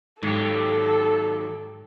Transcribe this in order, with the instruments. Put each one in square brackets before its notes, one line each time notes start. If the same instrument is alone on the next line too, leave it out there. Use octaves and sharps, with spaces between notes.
[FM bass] G#2 [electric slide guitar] D#3 F#3 G4 [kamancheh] A4